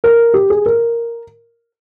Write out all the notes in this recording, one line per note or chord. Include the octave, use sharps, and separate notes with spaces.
A#4
G4
G#4
A#4